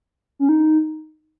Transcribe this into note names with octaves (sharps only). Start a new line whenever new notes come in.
C#4
D#4